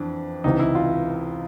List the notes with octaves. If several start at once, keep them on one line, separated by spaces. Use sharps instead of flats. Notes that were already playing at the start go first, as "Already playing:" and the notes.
Already playing: F2 E3 D4
C#2 C3 E3 D#4
E4
F4